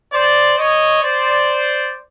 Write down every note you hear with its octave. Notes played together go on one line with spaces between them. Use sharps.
C5 D5
C#5 D#5
C5 D5